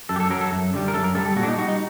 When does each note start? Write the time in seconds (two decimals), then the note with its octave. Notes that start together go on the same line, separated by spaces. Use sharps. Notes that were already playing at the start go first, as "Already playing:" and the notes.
0.09 F#2 A4
0.16 G4
0.20 A4
0.30 F#3 A#4
0.41 A4
0.52 F#2
0.74 D3 G3
0.88 A#4
0.94 F#2 A4
1.04 A#4
1.15 D3 G3 A4
1.26 A4
1.36 A#2 F#4
1.43 D4
1.48 D#4
1.58 G3 F#4
1.68 D#4